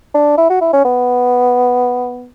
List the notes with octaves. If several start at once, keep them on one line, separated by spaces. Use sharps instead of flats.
D4
E4
F#4
E4
C#4
B3